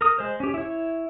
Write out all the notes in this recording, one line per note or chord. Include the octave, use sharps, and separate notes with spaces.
A#4 D#6
G#3 C5
C#4 G4
E4 C#5